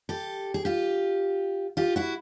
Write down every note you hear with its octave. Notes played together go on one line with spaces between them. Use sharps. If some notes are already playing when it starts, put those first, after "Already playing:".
G4 A4
G#4
F4 G4
F4 G4
E4 F#4